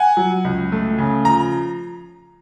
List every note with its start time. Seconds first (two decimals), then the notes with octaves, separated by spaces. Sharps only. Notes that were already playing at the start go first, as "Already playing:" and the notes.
Already playing: F#5 G#5
0.17 F#3
0.45 C#2
0.72 A3
0.98 C#3
1.25 F3 A#5